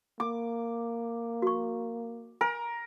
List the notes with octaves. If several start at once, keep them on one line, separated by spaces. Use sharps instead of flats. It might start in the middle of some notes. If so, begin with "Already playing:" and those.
A#3 D6
F#4 C#6
A#4 G#5